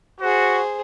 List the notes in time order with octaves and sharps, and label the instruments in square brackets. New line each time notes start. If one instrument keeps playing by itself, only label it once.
[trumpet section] F#4 [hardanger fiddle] G#4 C5